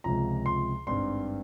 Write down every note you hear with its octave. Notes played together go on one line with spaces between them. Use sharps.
C#2 C3 F3 A#5
C6
G#1 G2 G3 C4 C6